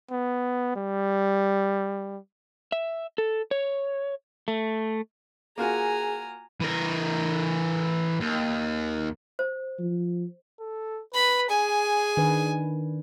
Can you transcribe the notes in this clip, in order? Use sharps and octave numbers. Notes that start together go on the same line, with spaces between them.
B3
G3
E5
A4
C#5
A3
A#3 F4 F#4 G#4 G#5 A#5
E3 A#4
D#2
C5
F3
A4
B4 B5
G#4 G#5
D#3 D4 B4